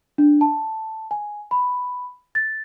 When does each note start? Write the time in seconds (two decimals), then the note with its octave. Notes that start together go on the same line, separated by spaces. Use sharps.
0.18 D4
0.41 A5
1.11 G#5
1.51 B5
2.35 A6